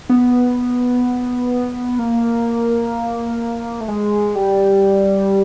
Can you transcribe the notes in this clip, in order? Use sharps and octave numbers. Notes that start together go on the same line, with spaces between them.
B3
A#3
A3
G#3
G3